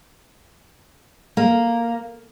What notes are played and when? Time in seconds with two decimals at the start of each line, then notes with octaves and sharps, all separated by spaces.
1.37 A#3